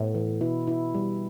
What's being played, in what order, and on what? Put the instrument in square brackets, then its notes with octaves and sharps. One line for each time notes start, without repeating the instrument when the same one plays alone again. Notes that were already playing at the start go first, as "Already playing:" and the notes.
Already playing: [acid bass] A2 [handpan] B3
[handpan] E3
[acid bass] B2 [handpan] E4
[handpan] E4
G3